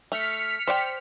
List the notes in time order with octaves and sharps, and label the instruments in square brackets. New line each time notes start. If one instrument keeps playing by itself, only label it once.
[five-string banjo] A3 [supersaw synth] F6 B6 C#7
[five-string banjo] C5 D5 G5